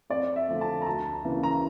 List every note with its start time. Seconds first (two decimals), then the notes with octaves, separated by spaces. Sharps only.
0.10 F2 D5
0.36 E5
0.48 D3 F3 A3
0.61 A5
0.81 A#5
0.86 D2 A5
1.25 C#3 E3 A#3
1.43 A#5